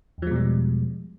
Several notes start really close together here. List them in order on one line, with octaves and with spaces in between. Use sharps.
E2 F3 G#3 B2 G3